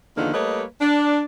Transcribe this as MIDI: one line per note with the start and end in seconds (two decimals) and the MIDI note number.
0.17 0.33 40
0.17 0.33 50
0.17 0.33 51
0.17 0.33 53
0.17 0.33 58
0.17 0.33 63
0.34 0.63 55
0.34 0.63 57
0.34 0.63 58
0.34 0.63 71
0.34 0.63 73
0.34 0.63 75
0.81 1.23 62